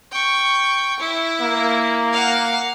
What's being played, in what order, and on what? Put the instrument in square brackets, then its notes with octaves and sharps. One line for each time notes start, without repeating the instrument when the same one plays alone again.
[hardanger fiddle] G5 C#6
E4
[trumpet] A#3
[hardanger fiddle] F5 F#5